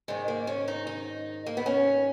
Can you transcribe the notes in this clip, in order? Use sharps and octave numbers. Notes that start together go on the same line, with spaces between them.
G#2 D#3 G#3
A#3
C#4
D#4
D#4
A#3
B3
C#4